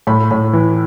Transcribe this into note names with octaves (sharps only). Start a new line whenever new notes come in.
A2 B5
A2
E3